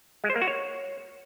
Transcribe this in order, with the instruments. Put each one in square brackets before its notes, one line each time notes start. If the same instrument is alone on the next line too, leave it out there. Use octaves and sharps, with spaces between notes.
[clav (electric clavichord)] G#3
C5
A#3
F#4
C#5